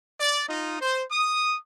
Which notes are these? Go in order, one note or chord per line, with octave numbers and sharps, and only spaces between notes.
D5
D#4 F4 D#5
C5
D#6